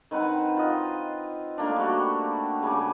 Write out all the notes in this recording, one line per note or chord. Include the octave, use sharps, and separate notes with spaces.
D#3 C4 B4 F#5
F4 D#5
A3 A#3 D4
G3 F#4
C#3 G3 G#5 D6